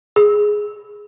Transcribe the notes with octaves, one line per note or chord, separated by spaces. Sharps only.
G#4